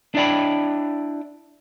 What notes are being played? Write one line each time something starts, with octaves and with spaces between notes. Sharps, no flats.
D4 E4 D5 G5 B5